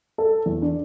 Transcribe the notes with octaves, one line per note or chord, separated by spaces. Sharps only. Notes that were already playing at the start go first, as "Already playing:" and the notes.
A4
E2
D4